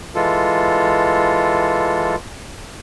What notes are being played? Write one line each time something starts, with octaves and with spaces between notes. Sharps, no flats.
E3 G#3 F4 A4